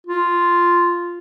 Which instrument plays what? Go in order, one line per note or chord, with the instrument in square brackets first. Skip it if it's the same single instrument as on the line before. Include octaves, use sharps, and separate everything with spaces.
[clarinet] F4